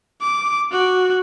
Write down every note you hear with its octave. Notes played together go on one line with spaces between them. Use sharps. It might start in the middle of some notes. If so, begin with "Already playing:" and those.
D6
F#4